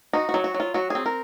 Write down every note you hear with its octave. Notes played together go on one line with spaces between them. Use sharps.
D#4 F#4
F#4
F#3
F#4
F#3
F4
F#3 F#4
C4 G#4
A#4